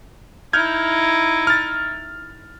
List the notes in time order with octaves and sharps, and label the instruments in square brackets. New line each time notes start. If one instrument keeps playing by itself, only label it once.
[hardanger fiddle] D#4 E4 [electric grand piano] F6 G6 G#6
[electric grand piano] F6 A6